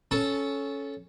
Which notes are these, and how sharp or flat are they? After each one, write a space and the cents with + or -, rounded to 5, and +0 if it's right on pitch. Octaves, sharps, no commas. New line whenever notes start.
C#4 +0 A4 -15 A5 +0